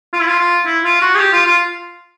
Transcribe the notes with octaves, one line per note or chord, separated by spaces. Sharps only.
F4
E4
F4
F4
E4
F4
F#4
G#4
G4
F4
F4